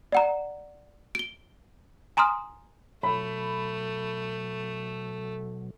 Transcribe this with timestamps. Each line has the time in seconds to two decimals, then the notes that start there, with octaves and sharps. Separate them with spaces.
0.12 D5 F#5 A#5
1.15 D7 G7
2.17 G#5 A#5 C6 D#6 F6
3.03 B2 F#3 A3 B5